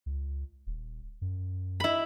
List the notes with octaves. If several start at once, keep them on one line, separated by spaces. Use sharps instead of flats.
C#2
D#1
F#2
E4 B5